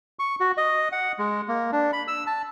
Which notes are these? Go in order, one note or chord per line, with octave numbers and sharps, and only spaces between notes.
C#6
F#4
D#5
F#5
G#3
A#3
D4
B5
E6
A5